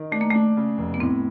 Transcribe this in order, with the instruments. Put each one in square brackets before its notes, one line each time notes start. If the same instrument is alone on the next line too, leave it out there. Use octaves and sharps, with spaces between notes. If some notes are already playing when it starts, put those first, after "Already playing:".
Already playing: [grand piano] D#3
[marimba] A3 [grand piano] D4
[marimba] A#3
[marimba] A3 [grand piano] D4
[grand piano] C#3
F1
[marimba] B3
[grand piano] A2 [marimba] C4